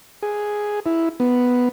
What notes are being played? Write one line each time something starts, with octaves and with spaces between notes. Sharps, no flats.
G#4
E4
B3